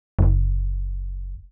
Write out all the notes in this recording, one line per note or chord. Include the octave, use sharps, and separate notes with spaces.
F#1